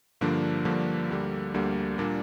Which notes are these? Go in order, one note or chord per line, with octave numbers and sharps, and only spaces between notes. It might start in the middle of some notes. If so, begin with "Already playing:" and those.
G2 D3 F3 A#3 D4
G2 D3 F3 A#3 D4
D2 D3 G3 A#3
D2 D3 G3 A#3
A#2 G3 A#3 D4